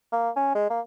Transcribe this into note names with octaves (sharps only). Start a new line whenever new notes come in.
A#3
C#4
G#3
A#3